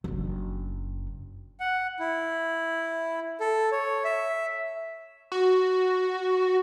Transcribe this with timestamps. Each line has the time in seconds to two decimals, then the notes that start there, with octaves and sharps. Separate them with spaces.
0.04 F#1 D4
1.60 F#5
2.00 E4
3.40 A4
3.72 C#5
4.04 E5
5.32 F#4